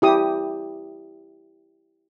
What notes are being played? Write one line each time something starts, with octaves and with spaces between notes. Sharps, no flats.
E4 G4 D#6